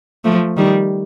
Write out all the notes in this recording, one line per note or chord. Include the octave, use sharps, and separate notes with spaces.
F3 A3
D#3 G3